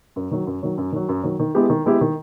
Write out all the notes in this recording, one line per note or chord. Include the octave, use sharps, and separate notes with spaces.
F#2
D#3 F#3
F#2
D#3 F#3
F#2
D#3 F#3
F#2
D#3 F#3
D#3
G#3 B3 E4 G4
D#3
G#3 B3 E4 G4
D#3